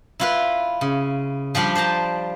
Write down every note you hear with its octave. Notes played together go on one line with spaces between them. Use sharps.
E4 F4 B4
C#3
F3 G3 D4 F4
C5 D5 A5 A#5